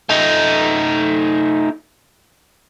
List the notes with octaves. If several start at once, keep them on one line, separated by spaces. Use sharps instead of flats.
A3 D#4